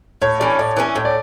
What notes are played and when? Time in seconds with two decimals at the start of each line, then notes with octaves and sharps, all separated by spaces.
0.22 A2 C#5
0.40 E3 A3 C#4 D5
0.59 A2 D5
0.77 E3 A3 C#4
0.95 A2 C#5
1.05 D5